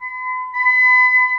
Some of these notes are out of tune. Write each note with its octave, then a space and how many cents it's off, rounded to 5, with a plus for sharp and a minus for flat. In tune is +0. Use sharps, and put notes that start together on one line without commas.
B5 +45
B5 +35